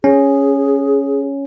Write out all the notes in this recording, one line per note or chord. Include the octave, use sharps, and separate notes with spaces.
C#4 G#4